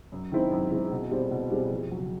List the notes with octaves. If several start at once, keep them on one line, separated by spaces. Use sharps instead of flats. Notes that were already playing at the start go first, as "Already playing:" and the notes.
F#2
D#3 G#3 C4 E4
F#2
D#3 G#3 C4 E4
B2
G3 C4 E4 G#4
B2
G3 C4 E4 G#4
F2
C#3 F#3